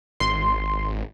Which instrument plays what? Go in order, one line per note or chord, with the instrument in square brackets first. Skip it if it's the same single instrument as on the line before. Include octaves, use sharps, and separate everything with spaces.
[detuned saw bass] G#1 [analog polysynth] C6